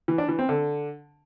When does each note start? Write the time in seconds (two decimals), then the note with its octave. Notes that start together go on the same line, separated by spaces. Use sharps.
0.08 E3
0.18 D4
0.28 E3
0.39 C4
0.49 D3